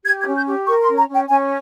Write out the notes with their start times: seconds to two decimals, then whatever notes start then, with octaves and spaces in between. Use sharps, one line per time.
0.05 G4 G#6
0.21 G#6
0.26 C#4
0.36 G6
0.46 G4
0.67 A#4 C#6
0.83 C6
0.88 C#4
0.98 A#5
1.09 C#4 G5
1.29 C#4 G#5